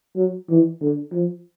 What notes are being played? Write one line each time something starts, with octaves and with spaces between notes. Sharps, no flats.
F#3
E3
D3
F3